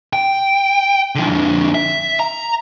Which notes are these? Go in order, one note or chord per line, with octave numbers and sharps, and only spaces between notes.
G5
D3 F3
F2 D3
E5
A#5